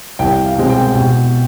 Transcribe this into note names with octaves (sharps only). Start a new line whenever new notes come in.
C2 G5
F5
B2 G#3 C4
G5
B2 G5